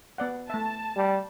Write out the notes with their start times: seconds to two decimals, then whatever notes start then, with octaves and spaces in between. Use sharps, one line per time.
0.18 B3 D5 F#5
0.50 A3 E5 A5
0.97 G3